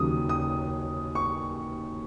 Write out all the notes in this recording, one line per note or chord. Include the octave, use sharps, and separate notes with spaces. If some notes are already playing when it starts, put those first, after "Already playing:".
Already playing: D#2 C#3 F#3 D#6
D#6
C#6